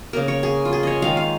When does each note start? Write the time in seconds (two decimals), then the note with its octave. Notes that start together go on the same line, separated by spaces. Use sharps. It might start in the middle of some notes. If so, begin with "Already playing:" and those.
0.13 C#3 A#3 A#4
0.28 C#5
0.43 G#4
0.65 F4
0.73 G#4
0.83 C#5 D#5
1.02 D#3 G#3 F5
1.17 F5